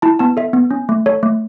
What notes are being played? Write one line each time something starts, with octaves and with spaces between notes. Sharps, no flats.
E4 A5
B3 A5
A4 E5
B3
C#4
A3
A4 C#5
A3